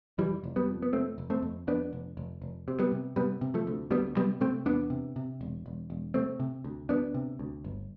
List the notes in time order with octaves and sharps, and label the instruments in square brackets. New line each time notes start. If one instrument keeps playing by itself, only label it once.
[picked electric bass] F1 E3 G3
F1
G3 B3
F2
B3
F1 A3 C4
F1
A3 C4
F2
F2 B3 D4
F1
F1
F1
C3
G3 B3
C3
C3 G3 B3
C3
F3 A3
D2
D2 G3 B3
C3 G3 B3
C3 A3 C4
E2 B3 D4
C3
C3
E1
E1
E1
C3 A3 C4
C3
D2
D2 B3 D4
C3
D2
G1